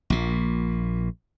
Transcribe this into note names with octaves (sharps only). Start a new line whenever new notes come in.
A#1 A#2